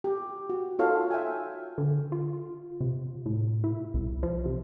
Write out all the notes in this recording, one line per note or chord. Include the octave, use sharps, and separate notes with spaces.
G4
F#4
D#4 F4 F#4 A4 C#5 F5
E5 G5 G#5
D3
F4
C3
A2
E4
C2
F3
C3